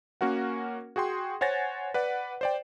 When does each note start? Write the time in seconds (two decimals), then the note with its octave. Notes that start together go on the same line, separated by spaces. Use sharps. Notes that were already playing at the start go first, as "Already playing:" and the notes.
0.21 A#3 C#4 F#4 A#4 F#5
0.96 F#4 G#4 G5 C6
1.41 C5 C#5 F#5 G#5 A6 A#6
1.94 B4 D5 F#5
2.41 C5 D5 G5